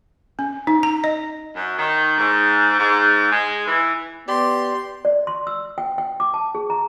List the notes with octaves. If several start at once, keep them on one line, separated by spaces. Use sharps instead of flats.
C#4
D#4
A#5
D#5
F#2
D#3
G#2
G#2
G#3
E3
B3 G4 D5 C6
D5
C6
E6
G5
G5
D6
A5
G#4
A#5